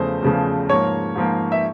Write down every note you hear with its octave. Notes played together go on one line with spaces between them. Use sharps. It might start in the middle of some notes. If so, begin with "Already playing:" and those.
Already playing: E2 C#3 F3 A3 C5
E2 C#3 F3 A3
G#2 F3 A#3 C#5
G#2 F3 A#3
E5